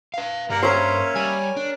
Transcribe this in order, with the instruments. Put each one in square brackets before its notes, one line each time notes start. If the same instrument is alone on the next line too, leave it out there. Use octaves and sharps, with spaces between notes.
[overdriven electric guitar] B4 F5
[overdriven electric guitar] G2 G3 [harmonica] A#3 F#5 A#5
[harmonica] A#3 C#4 E5 [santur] A#4 C#5 [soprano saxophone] C5
[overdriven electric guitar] G3 [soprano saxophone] G#5
[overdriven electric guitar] D4